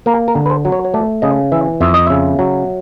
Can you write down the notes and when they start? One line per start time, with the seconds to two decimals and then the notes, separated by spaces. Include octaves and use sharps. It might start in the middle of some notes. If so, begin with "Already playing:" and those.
0.06 A#3 A#4
0.28 A#4
0.35 D3
0.46 B4
0.50 C5
0.65 F#3
0.72 C#5
0.85 C#5
0.94 A3 D5
1.22 C#3 D#5
1.52 E3 E5
1.81 F2 E5
1.94 D#5
2.07 C#3 E5
2.39 F#3